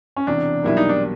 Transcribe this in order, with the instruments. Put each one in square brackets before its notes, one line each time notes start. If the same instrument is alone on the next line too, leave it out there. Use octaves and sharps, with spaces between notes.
[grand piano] C#4
[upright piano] E1 E2 C3 [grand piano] D4
[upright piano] B1 B2 G3 A#3 [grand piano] E4
[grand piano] D#4
D4